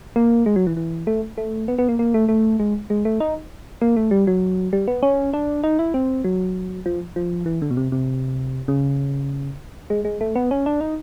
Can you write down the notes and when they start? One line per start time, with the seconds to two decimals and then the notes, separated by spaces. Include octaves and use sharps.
0.16 A#3
0.46 G#3
0.56 F#3
0.67 E3
0.77 E3
1.07 A3
1.38 A3
1.68 B3
1.78 B3
1.89 A#3
1.99 A#3
2.14 A3
2.29 A3
2.60 G#3
2.90 G#3
3.05 A3
3.20 D#4
3.81 A#3
3.96 A3
4.11 G3
4.27 F#3
4.73 G3
4.88 B3
5.03 C#4
5.33 D4
5.64 D#4
5.79 E4
5.94 C4
6.24 F#3
6.86 F3
7.16 F3
7.46 E3
7.62 D3
7.71 B2
7.77 C3
7.92 C3
8.68 C#3
9.90 G#3
10.05 G#3
10.21 A3
10.35 B3
10.51 C#4
10.66 D4
10.81 D#4